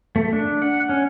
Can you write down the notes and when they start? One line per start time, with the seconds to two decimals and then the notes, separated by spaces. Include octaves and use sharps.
0.16 A3
0.33 D4
0.62 F#5
0.89 C#4